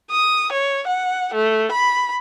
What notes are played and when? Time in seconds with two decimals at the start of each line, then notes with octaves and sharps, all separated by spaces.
0.11 D#6
0.52 C#5
0.87 F#5
1.34 A3
1.71 B5